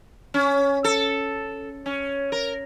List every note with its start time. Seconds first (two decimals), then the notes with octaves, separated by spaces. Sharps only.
0.34 C#4
0.84 A4
1.86 C#4
2.32 A#4